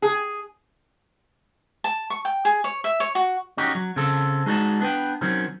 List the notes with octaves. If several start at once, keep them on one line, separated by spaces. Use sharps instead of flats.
G#4
A5
C#6
G5
G#4
C#5
E5
C#5
F#4
C#4 D#4 F#4 G4
F#3
C#3 C4 A4
G#3 D#4 F#4 C5 D5 A5
B3 D4 B4 G5
D#3 F#3 C4 C#4